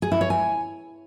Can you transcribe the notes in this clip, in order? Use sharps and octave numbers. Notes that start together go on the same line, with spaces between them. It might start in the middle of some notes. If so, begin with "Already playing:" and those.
G#4
E4
C#5
G#5